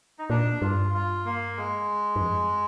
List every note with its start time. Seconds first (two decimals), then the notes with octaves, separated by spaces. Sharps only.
0.19 D#4
0.30 A#2 D4
0.62 G2 F4
0.94 F4
1.25 A#3
1.57 G#3
2.16 G2
2.21 F2